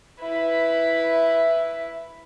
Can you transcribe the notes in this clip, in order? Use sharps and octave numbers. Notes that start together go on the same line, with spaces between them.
E4 B4 E5